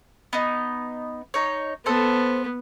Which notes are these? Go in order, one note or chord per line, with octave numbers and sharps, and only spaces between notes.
B3 D#4
D#4 C#5
B3 A4 C5